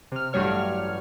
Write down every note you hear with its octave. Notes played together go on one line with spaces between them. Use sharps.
C3 F6
A1 G2 F#3 G3 C#5 F6